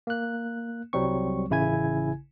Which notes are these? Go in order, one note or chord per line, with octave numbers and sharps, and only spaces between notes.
A#3 F#6
C2 F#3 G3 C4 C#6
A1 C#3 E4 G#5 G#6